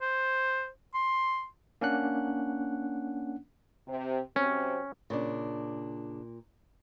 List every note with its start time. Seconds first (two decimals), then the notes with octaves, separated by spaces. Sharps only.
0.01 C5
0.94 C6
1.81 A#3 C#4 D4 F#5 F#6
3.87 C3
4.36 C3 F#3 C4 C#4
5.10 A#2 C#3 D4